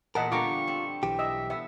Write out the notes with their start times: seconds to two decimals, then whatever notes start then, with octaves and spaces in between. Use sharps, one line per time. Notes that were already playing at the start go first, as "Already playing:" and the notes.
0.15 E2 A#2 A#4 B4 D#5 F#5 A5
0.32 D3 G3 B3 F4 A#5 C#6 D6
0.67 C4
1.03 B1 E3 G4
1.19 D#5 E5 E6
1.50 B3 E5